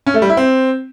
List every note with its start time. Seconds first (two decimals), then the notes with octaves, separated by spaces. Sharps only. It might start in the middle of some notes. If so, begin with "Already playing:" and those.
0.06 C#4
0.14 A3
0.22 G3
0.30 E4
0.37 C4